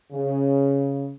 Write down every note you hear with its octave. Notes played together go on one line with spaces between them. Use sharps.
C#3